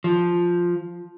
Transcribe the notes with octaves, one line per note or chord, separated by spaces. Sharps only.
F3